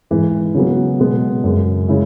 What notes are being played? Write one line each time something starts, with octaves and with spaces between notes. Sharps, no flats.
G#2 E3 G#3
C#3 F#3 B3
B2 G#3 B3
F#2 C#3 G#3
C#3 G#3 E4 G#4